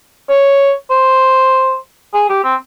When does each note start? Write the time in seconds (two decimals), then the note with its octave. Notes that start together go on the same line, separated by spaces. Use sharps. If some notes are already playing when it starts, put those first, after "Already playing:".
0.29 C#5
0.90 C5
2.14 G#4
2.29 G4
2.44 C4